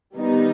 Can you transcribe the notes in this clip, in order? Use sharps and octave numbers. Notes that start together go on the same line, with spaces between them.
D#3 G3 B3 D#4